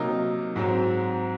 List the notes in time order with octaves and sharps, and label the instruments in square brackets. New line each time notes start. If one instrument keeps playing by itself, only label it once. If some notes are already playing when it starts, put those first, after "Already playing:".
Already playing: [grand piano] C3 F#3 A#3 D#4
G#2 F#3 C4